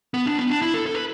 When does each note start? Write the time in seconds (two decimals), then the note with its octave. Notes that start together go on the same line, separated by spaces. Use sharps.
0.14 B3
0.26 D4
0.38 B3
0.50 D4
0.62 E4
0.74 A4
0.86 A4
0.94 B4